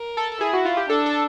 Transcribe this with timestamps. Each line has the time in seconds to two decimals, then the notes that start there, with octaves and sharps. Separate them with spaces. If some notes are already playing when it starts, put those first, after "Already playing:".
Already playing: A#4
0.17 A4
0.32 A4
0.40 E4 G#4
0.53 F#4
0.65 F4
0.77 G4
0.89 D4 A4
1.06 A4